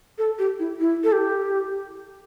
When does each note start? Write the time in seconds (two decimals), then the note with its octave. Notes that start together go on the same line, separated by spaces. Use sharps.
0.18 A4
0.39 G4
0.59 E4
0.80 E4
1.04 A4
1.12 G4